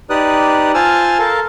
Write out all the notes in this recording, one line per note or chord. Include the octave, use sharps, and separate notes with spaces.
D#4 G4 B4 D5 D#6 F#6
F4 C5 G#5 A5 E6 F6
A4 A#4 F5 A5